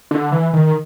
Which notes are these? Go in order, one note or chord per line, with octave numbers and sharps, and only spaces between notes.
D3
E3
D#3